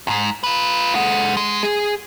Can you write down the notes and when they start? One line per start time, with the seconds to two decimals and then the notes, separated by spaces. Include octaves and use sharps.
0.07 E2 G#2
0.44 F4 B4
0.95 G#3 F#5
1.37 G#3
1.63 G#4